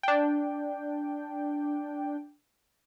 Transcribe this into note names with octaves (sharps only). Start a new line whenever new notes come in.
D4 G5